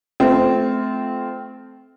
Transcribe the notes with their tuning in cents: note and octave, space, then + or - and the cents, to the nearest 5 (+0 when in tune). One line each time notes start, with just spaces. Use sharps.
A3 -25 C4 -15 F4 +0